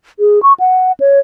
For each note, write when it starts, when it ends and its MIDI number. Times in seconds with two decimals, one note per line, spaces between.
0.19 0.42 68
0.42 0.53 85
0.60 0.92 78
1.00 1.19 73